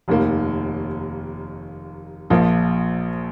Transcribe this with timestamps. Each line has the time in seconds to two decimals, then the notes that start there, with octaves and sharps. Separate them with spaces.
0.08 F1 D#2 D#3 A#3
2.30 A#1 A#2 F3 A#3